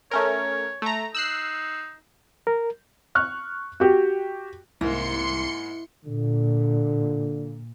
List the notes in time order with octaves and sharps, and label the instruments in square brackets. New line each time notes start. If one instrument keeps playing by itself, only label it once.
[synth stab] A3 C#4 A#4 [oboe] C#5
[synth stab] A3 A#5
[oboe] D#4 [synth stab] E6 F#6 C7
[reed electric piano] A#4
[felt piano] C#6 F6 F#6
F#4 G4
[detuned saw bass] C2 [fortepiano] G#2 A#3 [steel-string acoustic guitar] E4 [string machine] C6 C#7
[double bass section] A#2 [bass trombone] D3